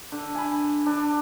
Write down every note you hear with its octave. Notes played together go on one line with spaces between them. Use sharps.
D3
G#5 B5
D4